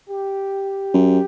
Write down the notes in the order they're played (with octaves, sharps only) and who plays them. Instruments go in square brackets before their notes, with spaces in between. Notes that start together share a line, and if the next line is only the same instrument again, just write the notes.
[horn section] G4
[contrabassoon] F#2